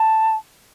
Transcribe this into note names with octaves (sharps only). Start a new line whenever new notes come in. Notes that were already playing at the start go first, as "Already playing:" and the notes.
Already playing: A5